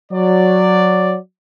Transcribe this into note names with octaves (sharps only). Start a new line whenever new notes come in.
F#3 D5